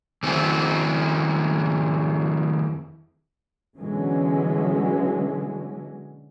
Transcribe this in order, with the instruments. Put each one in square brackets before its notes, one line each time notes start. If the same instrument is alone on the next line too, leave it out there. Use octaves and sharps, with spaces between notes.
[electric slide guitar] F2 D#3 C4 E4
[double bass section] B2 D3 E3 F#3 G#3 C#4